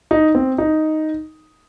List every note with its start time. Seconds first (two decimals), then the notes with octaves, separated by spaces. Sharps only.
0.11 D#4
0.35 C4
0.58 D#4